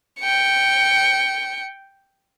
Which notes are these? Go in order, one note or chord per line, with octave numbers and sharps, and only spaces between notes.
G5 C#7